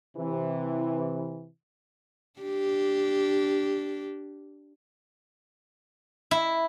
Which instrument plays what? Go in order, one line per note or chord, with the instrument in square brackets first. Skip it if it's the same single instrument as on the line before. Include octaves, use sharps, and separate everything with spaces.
[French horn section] C3 E3
[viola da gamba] D4 G4
[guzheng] E4